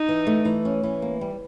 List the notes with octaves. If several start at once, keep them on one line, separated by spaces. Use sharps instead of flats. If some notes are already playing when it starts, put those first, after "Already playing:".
Already playing: D#4
E3
A3
E3
C#4
E3
A#3
G3